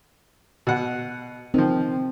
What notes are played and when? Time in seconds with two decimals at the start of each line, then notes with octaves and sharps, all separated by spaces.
0.67 B2 F#5
1.54 D#3 F3 C4